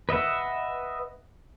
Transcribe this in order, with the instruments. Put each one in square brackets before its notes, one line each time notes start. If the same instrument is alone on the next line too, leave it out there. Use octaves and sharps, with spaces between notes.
[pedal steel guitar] B4 D#5 E5 F#5